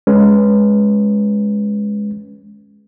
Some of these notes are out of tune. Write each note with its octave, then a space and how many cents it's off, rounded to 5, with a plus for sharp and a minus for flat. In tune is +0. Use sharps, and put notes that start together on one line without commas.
G#3 +0 C#4 +0 B4 +0